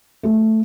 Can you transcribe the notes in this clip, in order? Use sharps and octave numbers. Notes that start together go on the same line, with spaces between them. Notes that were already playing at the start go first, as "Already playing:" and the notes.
A3